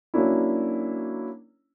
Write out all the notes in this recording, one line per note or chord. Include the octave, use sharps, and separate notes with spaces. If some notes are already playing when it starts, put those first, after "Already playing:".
F#3 A#3 C#4 D4 E4